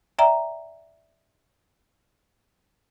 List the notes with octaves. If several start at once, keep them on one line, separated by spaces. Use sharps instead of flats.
D5 E5 G5 A#5